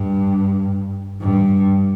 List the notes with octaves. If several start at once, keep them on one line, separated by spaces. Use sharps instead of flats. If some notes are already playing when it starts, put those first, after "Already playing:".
Already playing: G2
G2